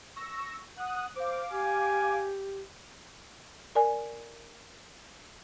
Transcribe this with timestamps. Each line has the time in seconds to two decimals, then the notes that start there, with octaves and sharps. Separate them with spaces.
0.16 C#6 E6 A#6
0.78 F#5 D#6 F#6
1.16 C5 F5 D6
1.51 G4 G#5
3.75 A#4 D5 G#5